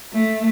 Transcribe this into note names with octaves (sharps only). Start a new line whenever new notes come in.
A3